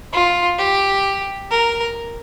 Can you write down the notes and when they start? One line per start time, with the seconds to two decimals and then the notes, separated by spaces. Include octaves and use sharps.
0.13 F4
0.58 G4
1.51 A#4